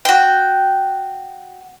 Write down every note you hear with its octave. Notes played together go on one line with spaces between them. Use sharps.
F#4 G5